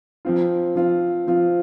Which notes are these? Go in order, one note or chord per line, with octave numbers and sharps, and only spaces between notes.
F3 C4 F4
F3 C4 F4
F3 C4 F4